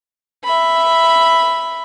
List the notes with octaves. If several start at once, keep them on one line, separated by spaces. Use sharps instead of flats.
E5 B5